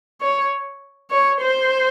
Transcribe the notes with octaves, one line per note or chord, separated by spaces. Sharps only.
C#5
C#5
C5